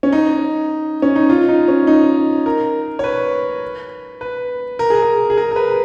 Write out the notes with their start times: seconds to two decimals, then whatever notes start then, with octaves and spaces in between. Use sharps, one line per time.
0.03 C#4
0.12 D#4
1.02 C#4
1.16 D#4
1.30 F4
1.49 D#4
1.68 C#4
1.87 D#4
2.46 A#4
2.99 C#5
3.04 B4
4.21 B4
4.79 A#4
4.90 G#4
5.02 A#4
5.30 G#4
5.37 A#4
5.51 A#4
5.56 B4